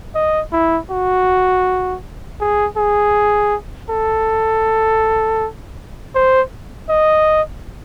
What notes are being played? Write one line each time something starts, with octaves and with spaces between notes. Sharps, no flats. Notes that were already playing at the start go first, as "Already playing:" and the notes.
D#5
E4
F#4
G#4
G#4
A4
C5
D#5